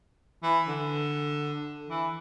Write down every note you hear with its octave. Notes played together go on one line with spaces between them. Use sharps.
E3
D3
E3